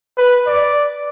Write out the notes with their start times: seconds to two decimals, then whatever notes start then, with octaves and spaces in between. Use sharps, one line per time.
0.17 B4
0.47 D5